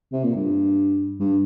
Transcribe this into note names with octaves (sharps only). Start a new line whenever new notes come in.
C3
A#2
G2
G2